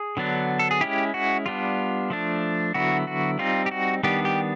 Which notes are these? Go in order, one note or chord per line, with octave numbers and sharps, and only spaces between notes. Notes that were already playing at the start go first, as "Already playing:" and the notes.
Already playing: G#4
D3 F#3 B3 D4
A4
G#4
G#3 C#4 E4 G4
F#4
G3 B3 D4 F4
F3 A3 D4
D3 F#3 B3 E4 F#4
F#4
G3 C4 D#4 F4
G4
F#4
D#3 G3 B3 D4 G4
G4